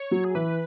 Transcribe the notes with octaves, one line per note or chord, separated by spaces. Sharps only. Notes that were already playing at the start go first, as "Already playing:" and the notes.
Already playing: C#5
F#3
G#4
E3 B4